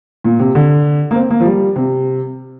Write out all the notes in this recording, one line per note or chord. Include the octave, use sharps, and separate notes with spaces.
A#2
C3
D3
A#3
C4
A#3
F3
G3
C3